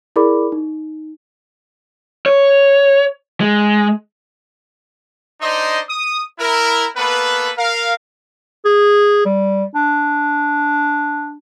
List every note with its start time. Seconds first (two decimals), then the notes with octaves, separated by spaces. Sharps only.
0.16 E4 G#4 A#4 D5 B5 D6
0.52 D#4
2.26 C#5
3.40 G#3
5.41 D4 D#4 C5 D5 D#5 C6
5.88 D#6
6.39 E4 A#4
6.96 A#3 B3 A4 B4
7.57 A#4 F5
8.65 G#4
9.25 G3
9.75 D4